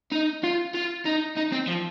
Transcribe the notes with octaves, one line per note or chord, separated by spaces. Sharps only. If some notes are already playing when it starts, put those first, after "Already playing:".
D#4
F4
F4
D#4
D#4
C4
F3